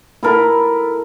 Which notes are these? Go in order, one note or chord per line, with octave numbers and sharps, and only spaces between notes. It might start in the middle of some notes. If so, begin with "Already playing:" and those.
E4 A4 A#4 B5